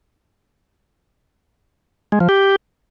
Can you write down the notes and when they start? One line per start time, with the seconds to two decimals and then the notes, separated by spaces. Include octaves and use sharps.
2.12 G#3
2.20 F3
2.29 G4